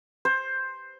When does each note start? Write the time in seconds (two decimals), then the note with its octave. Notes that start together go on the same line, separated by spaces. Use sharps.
0.25 C5